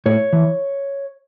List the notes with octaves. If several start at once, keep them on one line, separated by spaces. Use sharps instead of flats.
A2 C#5
E3